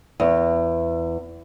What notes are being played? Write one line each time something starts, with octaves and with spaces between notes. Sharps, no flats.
E2